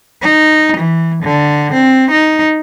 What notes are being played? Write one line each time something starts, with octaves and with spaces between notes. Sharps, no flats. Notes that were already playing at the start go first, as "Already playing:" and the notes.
D#4
E3
D3
C4
D#4